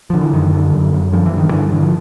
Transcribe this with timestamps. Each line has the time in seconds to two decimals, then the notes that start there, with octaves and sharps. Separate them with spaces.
0.10 D3 F3
0.21 E3
0.33 F#2 D#3
0.53 D3
0.73 F#2
0.94 F#2
1.12 G2 F3
1.26 E3
1.33 G2 D#3
1.50 G2 D3 E3
1.73 D3 E3
1.83 F3